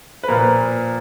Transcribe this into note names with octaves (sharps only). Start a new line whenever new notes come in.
B4
A#2 F3 A#4